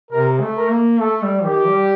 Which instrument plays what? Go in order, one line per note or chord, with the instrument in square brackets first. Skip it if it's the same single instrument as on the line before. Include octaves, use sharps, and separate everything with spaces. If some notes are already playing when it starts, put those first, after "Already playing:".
[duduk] C3 [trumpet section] A#4
[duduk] A3
[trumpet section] A#4
[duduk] A#3
[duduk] A3 [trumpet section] A4
[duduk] G3
[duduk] D#3 [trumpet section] G4
[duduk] G3